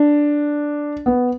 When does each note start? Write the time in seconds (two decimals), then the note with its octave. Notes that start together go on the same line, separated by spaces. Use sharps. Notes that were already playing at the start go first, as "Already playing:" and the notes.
Already playing: D4
1.06 B3